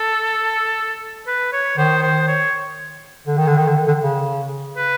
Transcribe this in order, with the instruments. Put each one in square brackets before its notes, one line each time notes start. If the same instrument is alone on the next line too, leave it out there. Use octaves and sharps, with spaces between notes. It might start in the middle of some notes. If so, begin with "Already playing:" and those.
Already playing: [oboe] A4
B4
C#5
[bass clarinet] D#3 [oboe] C5
[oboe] C5
C#5
[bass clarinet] D3
D#3
D3
D#3
D3
D#3
D3
C#3
[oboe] B4